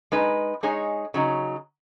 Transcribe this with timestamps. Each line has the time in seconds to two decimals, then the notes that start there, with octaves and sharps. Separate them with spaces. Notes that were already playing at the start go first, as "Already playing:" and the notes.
0.12 G#3 D#4 B4
0.63 G#3 D#4 G#4 C#5
1.14 C#3 F#3 D#4